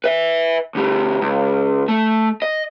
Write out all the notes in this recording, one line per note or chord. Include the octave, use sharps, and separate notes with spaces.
B4 E5
D2 G3
C#2
A3
D#5